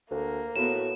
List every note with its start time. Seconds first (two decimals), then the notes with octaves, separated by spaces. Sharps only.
0.11 D2 A#3
0.56 A2 B3 F#4 E7